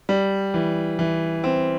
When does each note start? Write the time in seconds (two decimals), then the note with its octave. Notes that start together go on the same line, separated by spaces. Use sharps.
0.09 G3
0.54 E3
0.99 E3
1.44 C4